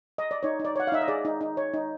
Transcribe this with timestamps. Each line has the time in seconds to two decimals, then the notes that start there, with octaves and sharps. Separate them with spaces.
0.18 D#5
0.31 D5
0.43 D#4 C#5
0.60 D#4
0.65 D5
0.76 C#5 F#5
0.87 F5
0.92 D#4 E5
1.01 D#5
1.08 G#4 D5
1.25 D#4
1.41 D#4
1.57 C#5
1.74 D#4